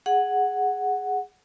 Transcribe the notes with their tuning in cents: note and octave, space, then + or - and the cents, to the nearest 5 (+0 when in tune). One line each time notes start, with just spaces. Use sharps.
G#4 +0 F#5 +0